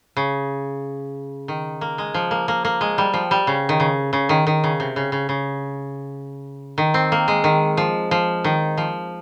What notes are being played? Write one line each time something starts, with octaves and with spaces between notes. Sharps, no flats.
C#3
D#3
A#3
G#3
F3
A#3
A#3
A#3
G#3
G3
F3
G3
C#3
D#3
C#3
C#3
D#3
D#3
C#3
C3
C#3
C#3
C#3
D#3
C4
A#3
G#3
D#3
F3
F3
D#3
F3